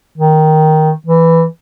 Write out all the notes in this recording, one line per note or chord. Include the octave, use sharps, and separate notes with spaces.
D#3
E3